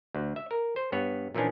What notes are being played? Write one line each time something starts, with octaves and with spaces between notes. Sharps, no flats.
D2
E5
A#4
C5
G2 B3 C#5
A#2 E3 F3 C#4 D4